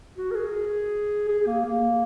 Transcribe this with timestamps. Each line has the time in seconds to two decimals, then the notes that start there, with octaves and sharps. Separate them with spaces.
0.17 F#4
0.31 A#4
0.35 G#4
1.28 G#4
1.46 A#3
1.65 A#3